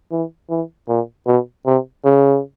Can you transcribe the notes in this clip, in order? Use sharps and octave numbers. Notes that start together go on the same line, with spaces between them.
E3
E3
A#2
B2
C3
C#3